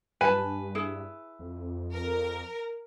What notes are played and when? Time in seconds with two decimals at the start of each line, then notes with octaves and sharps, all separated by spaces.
0.21 G2 B4 G#5 A5
0.75 E4 G#4
1.39 F2
1.93 A#4